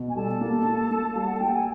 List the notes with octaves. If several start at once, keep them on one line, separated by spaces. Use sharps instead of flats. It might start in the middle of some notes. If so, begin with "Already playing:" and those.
Already playing: B2
G#5
G3 A4 A5
A#3
A#3
A#3
G3 F5
F#5
A#3 G5
G#5